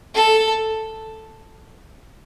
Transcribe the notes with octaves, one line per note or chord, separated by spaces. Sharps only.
A4